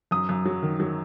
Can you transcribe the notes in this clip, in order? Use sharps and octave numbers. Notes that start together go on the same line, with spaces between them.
F#2 D#6
F#2
F#3
D#3
F#3